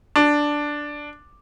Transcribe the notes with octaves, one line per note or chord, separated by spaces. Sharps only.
D4